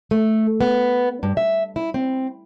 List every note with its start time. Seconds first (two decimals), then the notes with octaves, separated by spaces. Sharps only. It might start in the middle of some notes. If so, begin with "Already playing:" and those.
0.11 A3
0.61 B3
1.23 G2
1.37 E5
1.76 E4
1.94 C4